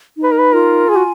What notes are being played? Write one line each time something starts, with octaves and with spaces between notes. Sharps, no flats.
D#4
B4
A#4
B4
F4 A#4
G#4 G#5
F#4